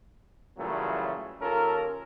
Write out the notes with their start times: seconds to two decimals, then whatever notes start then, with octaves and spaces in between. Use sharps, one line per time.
0.57 A#2 C#3 E3 F#3 G3 A3
1.42 D#2 C#4 F4 A4 A#4